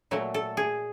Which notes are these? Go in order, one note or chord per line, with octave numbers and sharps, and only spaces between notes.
A#2 F#3 A3
A4
G#4